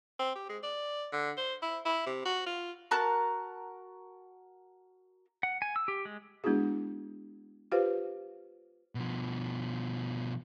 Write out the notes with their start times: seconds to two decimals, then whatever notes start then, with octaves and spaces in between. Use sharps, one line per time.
0.19 C4
0.35 G4
0.49 G#3
0.63 D5
1.12 D3
1.37 C5
1.62 E4
1.85 E4
2.06 C3
2.25 F#4
2.46 F4
2.91 F#4 A#4 A5 F#6
5.43 F#5
5.62 G#5
5.76 E6
5.88 G4
6.05 G#3
6.44 G#3 B3 D4 E4 F#4 G#4
7.72 F4 G4 B4 C5 F5
8.95 B2 F3